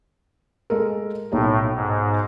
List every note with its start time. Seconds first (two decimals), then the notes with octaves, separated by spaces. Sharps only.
0.70 G#3 A4 A#4
1.32 B1 A2 D#4 C#5
1.75 G#2